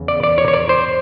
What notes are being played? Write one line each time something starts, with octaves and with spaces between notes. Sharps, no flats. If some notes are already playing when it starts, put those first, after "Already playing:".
Already playing: E2 C#3 E3
D5
D5
C#5
C#5
D5
C5